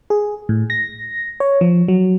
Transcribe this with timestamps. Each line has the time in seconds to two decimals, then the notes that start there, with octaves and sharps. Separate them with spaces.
0.10 G#4
0.49 A2
0.70 A#6
1.40 C#5
1.61 F3
1.88 F#3